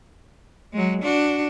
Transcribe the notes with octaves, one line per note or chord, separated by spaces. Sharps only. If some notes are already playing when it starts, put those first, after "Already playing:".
F#3 G#3
D4 F#4